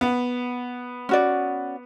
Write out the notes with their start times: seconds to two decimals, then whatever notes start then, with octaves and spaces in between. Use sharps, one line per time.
0.01 B3
1.09 C#4 F#4 D5